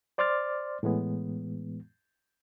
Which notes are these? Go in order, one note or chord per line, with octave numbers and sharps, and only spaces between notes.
C5 D5 C6 D6 F6 A6
A2 E3 G#3 B3